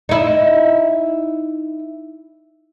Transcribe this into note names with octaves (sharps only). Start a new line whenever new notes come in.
D#4 E4